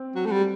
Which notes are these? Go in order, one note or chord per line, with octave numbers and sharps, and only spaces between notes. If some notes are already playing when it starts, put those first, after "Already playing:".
Already playing: C4
F#3
A3
G3